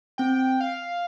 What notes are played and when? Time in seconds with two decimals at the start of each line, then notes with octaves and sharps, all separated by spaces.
0.18 C4 G5
0.61 F5